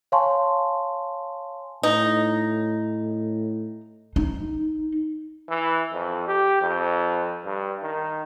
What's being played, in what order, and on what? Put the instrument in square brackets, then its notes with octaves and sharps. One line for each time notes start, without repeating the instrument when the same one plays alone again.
[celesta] C#5 F5 G#5 A5 C6 C#6
[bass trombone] A2 [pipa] D#4
[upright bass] D#4
[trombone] E3
F2
G4
F2
G2
D#3